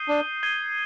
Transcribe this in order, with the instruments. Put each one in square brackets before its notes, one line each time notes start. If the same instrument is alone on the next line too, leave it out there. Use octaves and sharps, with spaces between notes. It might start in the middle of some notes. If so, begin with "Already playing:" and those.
Already playing: [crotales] D#6 G6 C7 D#7 G7
[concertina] D4
[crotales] G#6 C7 D#7 G7